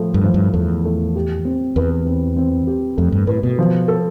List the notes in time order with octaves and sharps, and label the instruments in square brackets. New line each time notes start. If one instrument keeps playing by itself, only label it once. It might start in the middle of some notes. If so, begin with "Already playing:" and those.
Already playing: [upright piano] A2 F3 A3
[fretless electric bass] G2
[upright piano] F3
[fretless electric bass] G2
[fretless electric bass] E2 [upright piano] A3
[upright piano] A3
G4
C4
[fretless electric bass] E2 [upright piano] B4
[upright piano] C4
C4
G4
[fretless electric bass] F2 [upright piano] A3
[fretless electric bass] G2
[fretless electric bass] A2 [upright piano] B4
[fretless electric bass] B2
[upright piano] F3
A4